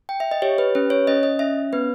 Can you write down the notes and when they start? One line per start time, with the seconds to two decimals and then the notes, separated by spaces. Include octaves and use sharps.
0.09 G5
0.20 E5
0.31 D#5
0.42 G4 C#5
0.58 B4
0.75 C#4 B4
0.90 C#5
1.07 C#4 D#5
1.23 D#5
1.39 C#4 E5
1.73 B3 B4